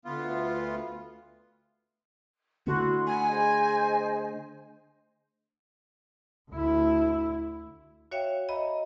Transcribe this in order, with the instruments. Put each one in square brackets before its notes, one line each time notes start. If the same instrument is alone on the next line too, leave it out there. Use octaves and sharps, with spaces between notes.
[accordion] D2 B3 F4
[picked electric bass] D3 A3 [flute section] E4 C6 [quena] F#4
[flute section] F#5 B5 [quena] G#5
[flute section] G#4 C5 D#5
[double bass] D2 E4
[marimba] F#4 C#5 E5 F5 G5
D#5 E5 A#5 B5